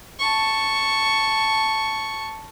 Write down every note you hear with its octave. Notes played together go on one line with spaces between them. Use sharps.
A5 C#6